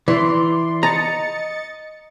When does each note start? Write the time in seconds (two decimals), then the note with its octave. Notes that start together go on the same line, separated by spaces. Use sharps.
0.08 E3 D5 C6
0.83 D#5 A#5 A6 C#7